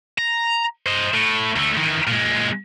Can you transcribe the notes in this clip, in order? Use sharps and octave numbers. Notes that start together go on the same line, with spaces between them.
A#5
C5 D#5
A2
D2 A3
D#3 E3
A#2 G#3